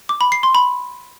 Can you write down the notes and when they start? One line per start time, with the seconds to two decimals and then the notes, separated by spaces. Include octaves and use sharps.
0.09 D6
0.21 B5
0.32 C7
0.43 C6
0.55 B5